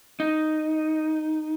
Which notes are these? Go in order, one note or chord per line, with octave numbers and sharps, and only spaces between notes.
D#4